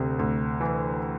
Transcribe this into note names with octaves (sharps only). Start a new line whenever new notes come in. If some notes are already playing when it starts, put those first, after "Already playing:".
Already playing: D2 C3
D2
E3